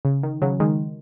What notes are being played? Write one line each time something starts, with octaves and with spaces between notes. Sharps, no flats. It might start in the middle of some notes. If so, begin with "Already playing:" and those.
C#3
D#3
C#3 F#3
D#3 G#3